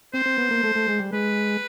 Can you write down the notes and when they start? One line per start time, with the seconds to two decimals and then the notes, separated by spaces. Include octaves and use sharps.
0.14 C4 C5
0.26 C4
0.38 B3
0.51 A#3
0.63 A3
0.75 A3
0.88 G#3
0.99 G3
1.12 G#3 B4